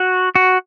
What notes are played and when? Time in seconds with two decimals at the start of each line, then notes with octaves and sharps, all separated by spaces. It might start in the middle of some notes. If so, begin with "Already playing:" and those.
Already playing: F#4
0.35 F#4